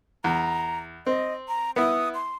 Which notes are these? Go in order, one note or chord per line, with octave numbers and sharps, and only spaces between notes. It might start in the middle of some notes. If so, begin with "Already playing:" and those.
E2 A#5
C4 D#5
A#5
B3 E4 D#6
C6